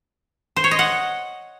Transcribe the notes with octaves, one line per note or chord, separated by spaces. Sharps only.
C5
C#5
D#5
F#5